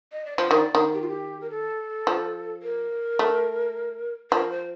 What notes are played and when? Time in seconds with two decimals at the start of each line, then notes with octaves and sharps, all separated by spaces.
0.12 D#5
0.25 D5
0.38 F3 C5
0.51 D#3
0.56 D5
0.75 D#3
0.94 G4
1.01 F4
1.08 G4
1.41 A#4
1.50 A4
2.07 F3
2.63 A#4
3.19 A3
4.31 F3 A#4
4.51 C5